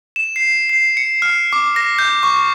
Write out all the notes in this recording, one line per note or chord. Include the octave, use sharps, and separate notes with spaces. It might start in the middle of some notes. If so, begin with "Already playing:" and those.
E7
C7
C7
C#7
F6
D6
A#6
G6
C#6